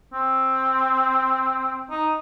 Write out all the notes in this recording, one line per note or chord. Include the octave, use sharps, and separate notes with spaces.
C4
D#4